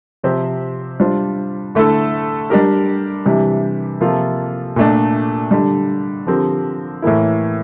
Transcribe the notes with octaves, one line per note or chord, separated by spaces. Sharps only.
C3 F3 C4 G4 C5
G3 D4 F4 C5
D3 A3 E4 A4
G3 D4 G4 A#4
C3 E3 G3 D4
C3 F3 A#3 F4 A4
A#2 A3 D4
D3 G3 D4
D3 F3 C4 G4 A#4
A2 E3 A#3 E4